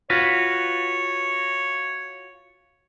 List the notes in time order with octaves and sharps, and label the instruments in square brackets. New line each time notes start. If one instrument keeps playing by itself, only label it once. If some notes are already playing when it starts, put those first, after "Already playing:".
[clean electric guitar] F4 F#4 B4 [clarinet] C#5